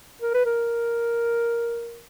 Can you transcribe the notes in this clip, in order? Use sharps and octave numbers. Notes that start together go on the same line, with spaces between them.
A#4
B4
A#4